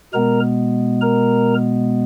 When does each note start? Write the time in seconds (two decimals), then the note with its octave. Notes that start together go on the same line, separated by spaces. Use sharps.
0.13 B2 G#3 B3 A#4 A#5
1.01 A#4 A#5